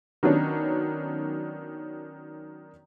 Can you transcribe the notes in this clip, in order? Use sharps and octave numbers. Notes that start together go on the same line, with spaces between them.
D#3 F#3 B3 C#4 D4